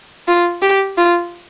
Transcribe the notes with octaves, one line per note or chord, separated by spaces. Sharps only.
F4
G4
F4